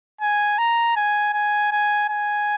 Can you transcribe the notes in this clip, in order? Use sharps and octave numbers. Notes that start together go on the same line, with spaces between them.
G#5
A#5
G#5
G#5
G#5
G#5